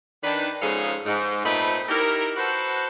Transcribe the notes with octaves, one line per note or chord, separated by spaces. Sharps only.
D#3 D4 B4
G#2 C#3 F3 G#4 A4 F5
G#2
A#2 A3 C4 D#4 B4 B5
D#4 E4 G4 A#4
F#4 A4 B4 C5 F#5